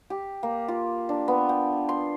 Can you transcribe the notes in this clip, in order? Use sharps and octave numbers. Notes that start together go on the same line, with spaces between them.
G4
A#3
F4
D4
B3
G5
C6